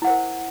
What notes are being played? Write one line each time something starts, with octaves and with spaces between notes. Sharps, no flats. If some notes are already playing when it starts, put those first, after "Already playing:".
E4 A#4 C5 F#5